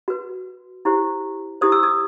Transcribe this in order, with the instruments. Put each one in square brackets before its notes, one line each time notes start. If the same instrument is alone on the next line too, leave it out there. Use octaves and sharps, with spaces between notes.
[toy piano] F#4 B4
E4 G4 C5
E4 G4 C5 D#6
E6
D#6